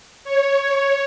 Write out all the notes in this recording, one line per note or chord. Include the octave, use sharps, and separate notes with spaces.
C#5